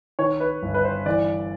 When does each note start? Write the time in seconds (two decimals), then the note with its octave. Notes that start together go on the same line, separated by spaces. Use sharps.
0.19 D#3 C#5
0.40 B4
0.63 G1
0.74 B4
0.84 C5
1.06 E3 D5